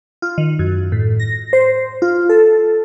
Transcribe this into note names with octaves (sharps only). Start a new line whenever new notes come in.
F4
D#3
F#2
A2
A#6
C5
F4
A4